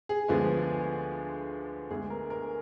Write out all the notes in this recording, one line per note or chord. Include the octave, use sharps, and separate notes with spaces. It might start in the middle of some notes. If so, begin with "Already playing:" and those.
G#4
D2 D3 F3 G#3 B3
D2 D3 G#3 B3 G#4
A#4
A#4